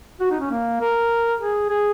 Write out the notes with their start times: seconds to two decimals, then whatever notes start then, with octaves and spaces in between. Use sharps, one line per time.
0.20 F#4
0.31 D#4
0.40 C#4
0.50 A#3
0.81 A#4
1.40 G#4
1.69 G#4